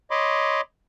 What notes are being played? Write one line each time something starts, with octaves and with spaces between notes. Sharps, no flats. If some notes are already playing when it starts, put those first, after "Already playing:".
C#5 D#5 B5 C6 D6